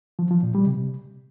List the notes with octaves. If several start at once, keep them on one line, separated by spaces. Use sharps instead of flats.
F3
F3
A#2
G3
C3